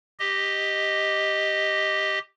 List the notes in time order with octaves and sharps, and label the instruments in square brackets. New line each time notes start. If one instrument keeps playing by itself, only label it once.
[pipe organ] G4 D#5